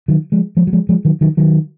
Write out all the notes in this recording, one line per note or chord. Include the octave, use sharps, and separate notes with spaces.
D#3 F#3
F3 G#3
F3 G#3
F#3
F3 G#3
F3 G#3
D#3 F#3
D#3 F#3
D#3 F#3